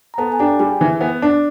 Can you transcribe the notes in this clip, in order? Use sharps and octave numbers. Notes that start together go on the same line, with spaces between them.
A#5
B3 A4 A5
G#5
D4 G4 G5
G3 G#4 G#5
E3
B3
D4